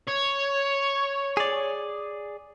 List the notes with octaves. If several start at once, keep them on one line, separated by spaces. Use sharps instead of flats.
C#5
G#4 D5